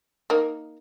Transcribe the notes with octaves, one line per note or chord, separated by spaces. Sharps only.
A#3 D#4